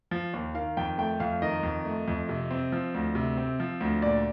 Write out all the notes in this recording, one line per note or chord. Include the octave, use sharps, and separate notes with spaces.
F3
D#2
D#3 F5
F2 G5
A3 G5
F2 F5
D#3 D#5
F2
A3
F2
C3
C4
F3
D2
C3
C4
F3
D2
A#2 D5